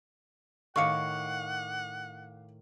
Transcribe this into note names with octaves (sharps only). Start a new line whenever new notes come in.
A2 D#3 F5 F#5 C#6 D6 C#7